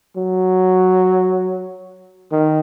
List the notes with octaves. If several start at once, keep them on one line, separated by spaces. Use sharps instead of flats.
F#3
D#3